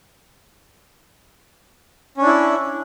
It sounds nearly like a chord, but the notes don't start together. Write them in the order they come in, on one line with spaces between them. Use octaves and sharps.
C#4 D4 E4